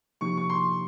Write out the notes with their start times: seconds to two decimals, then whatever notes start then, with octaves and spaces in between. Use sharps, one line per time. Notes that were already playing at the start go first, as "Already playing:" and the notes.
0.21 C3 F3 A#3 D#4 G4 C#6
0.37 C#6
0.50 C6